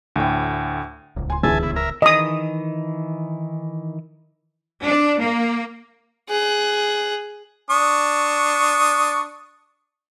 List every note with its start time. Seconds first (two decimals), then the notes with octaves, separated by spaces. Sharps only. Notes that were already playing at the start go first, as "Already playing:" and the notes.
0.16 D2 A2 G5
1.16 D1 C#2
1.30 G#5 C6
1.43 G1 E2 G#4 E5 G#5 A5
1.63 E4
1.76 A#4 E5
2.02 D#3 E3 D#5 D#6
4.85 D4
5.21 A#3
6.29 G#4 F#6
7.70 D4 C#6 D#6